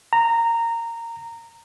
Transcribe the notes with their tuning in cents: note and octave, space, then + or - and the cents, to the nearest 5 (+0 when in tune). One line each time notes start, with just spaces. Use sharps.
A#5 -15